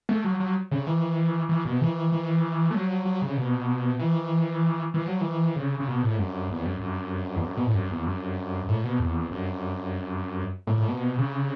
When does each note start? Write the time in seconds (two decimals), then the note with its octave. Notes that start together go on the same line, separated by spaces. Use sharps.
0.09 A3
0.24 F#3
0.40 F#3
0.71 C#3
0.87 E3
1.49 E3
1.65 B2
1.81 E3
2.12 E3
2.71 A3
2.75 F#3
3.05 F#3
3.22 C#3
3.37 B2
3.99 E3
4.94 E3
5.06 F#3
5.21 E3
5.56 C#3
5.80 C#3
5.88 B2
6.03 A2
6.19 F#2
6.50 E2
6.66 F#2
6.81 F#2
7.36 E2
7.44 F#2
7.57 B2
7.66 A2
7.74 F#2
7.90 E2
8.07 F#2
8.68 A2
8.84 B2
9.00 E2
9.31 F#2
10.67 A2
10.77 A2
10.88 B2
11.18 C#3